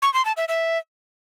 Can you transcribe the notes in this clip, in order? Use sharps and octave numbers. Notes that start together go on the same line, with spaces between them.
C#6
C6
A5
E5
E5